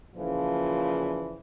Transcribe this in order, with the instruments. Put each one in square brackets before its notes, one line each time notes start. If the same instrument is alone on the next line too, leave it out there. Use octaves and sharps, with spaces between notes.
[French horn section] A#2 C#3 E3 F3